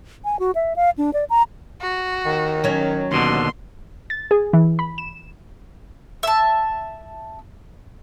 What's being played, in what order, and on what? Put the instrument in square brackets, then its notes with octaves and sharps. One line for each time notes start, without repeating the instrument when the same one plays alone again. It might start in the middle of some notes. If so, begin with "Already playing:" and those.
[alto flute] G#5
F#4
E5
F5
D4
D5
A#5
[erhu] F#4
[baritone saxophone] D#3
[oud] F#3 C#4
[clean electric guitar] D#2 B2 D3 [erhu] C6
[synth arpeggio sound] A6
G#4
E3
B5
E7
[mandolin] E5 A5